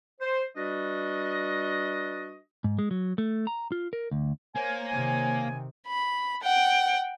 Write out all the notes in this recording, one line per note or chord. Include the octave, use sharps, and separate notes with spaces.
C5
G3 D4 F#4 B4 D#5
G#2
G#3
F#3
A3
A#5
F4
A#4
D2
A#3 C5 C#5 G#5
C3 D#3
B5
F#5 G5